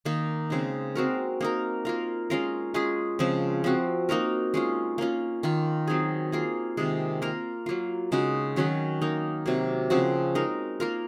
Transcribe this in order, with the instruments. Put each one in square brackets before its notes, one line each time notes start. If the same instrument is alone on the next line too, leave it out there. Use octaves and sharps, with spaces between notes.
[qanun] D#3 A#3 D#4
C#3 G#3 C4 D#4
G#3 C4 F#4 A#4
A#3 D#4 A#4
A#3 F4 A#4
G#3 C#4 F4 A#4
G#3 C#4 F4 G#4
C#3 F3 G#3 C4
F3 C4 F#4
A#3 D#4 F#4 A#4
G#3 C#4 F4
A#3 C#4 F4
D#3 A#3 F4
F#3 C4 D#4 G#4
A#3 F4 G#4
C3 D#3 G#3
A#3 F4 A#4
F#3 A#3 F4
C#3 G#3 D#4 F#4
D#3 F#3 C#4 F#4
A#3 D#4 A#4
C3 F#3 A#3
C#3 F3 C4 F#4
G#3 D#4 A#4
A#3 F4 A#4